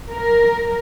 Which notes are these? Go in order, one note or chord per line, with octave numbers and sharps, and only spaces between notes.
A#4